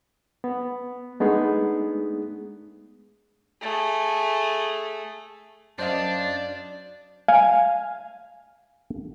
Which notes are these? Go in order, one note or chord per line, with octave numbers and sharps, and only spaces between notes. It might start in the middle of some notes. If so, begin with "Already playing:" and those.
B3
G#3 A3 B3 D4 D#4 G#4
A3 G#4
F#2 D4 C5 D5 D#5 F5
F5 G#5